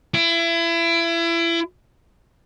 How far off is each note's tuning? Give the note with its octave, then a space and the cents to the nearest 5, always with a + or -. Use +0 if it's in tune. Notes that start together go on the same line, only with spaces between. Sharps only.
E4 +30